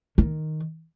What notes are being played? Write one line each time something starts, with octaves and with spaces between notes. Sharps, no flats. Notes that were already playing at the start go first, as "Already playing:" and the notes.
D#3